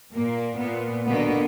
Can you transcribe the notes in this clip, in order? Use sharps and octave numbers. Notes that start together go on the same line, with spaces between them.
A#2 A#3
A#2 B3
B2 D3 A#3 B3